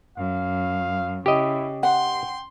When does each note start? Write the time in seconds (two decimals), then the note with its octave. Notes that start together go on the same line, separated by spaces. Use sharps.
0.17 F#2 F5
1.26 C#3 E4 G4 D#5
1.83 F#5 G5 C6